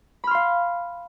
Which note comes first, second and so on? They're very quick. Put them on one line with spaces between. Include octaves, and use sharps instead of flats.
B5 F6 C6 F5